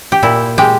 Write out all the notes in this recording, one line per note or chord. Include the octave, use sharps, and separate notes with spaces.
G4
A#2 E4
G#3 G4